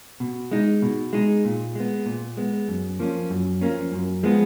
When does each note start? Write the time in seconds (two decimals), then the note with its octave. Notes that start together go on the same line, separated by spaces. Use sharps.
0.20 B2
0.51 G#3 D#4
0.82 B2
1.13 G#3 D#4
1.45 A#2
1.75 G#3 B3
2.06 A#2
2.37 G#3 B3
2.68 F#2
2.99 F3 A#3 C#4
3.30 F#2
3.61 F3 A#3 C#4
3.92 F#2
4.23 F3 G#3 B3